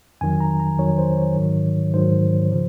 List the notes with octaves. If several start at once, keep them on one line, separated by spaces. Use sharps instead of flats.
F2 D#3 F#3 G#5
A#5
A#5
F2 D#3 F#3 C#5
C5
C#5
G#2 D#3 F#3
G#2 D#3 F#3 C5
C#3 F3